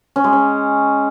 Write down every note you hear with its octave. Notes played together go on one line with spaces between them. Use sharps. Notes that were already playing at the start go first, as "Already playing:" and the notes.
C#4
G#3
C#4